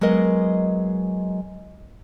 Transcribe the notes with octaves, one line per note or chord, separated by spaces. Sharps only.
F#3 G#3 B3 A#4 D#5